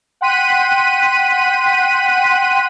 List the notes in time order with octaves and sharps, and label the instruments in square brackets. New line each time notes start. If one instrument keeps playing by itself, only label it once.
[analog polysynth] F#5 G5 C6 F#6 B6 D#7